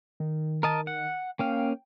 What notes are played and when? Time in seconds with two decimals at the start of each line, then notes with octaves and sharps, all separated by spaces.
0.20 D#3
0.63 A#4 D#5 A5
0.87 F#5
1.39 A#3 C#4 F5 G5